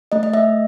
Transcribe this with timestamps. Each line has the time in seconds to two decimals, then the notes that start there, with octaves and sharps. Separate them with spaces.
0.12 A3 D#5
0.23 D#5
0.33 A3 E5